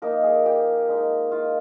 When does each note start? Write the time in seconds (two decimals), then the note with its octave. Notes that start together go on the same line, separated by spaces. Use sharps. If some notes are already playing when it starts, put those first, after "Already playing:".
0.02 F3 A#3 D#4 A#4
0.24 G#4
0.46 G4
0.89 G#3 D#4
1.31 F4